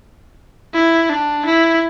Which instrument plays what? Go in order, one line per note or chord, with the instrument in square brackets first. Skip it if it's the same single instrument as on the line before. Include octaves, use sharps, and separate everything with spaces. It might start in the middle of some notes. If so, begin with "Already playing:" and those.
[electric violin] E4
D4
E4